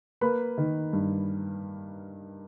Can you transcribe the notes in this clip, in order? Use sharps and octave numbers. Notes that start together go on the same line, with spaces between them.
A#3 B4 B5
D#3
G2